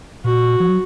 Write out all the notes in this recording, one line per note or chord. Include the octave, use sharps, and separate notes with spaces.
A#2 F#4
F3
F#3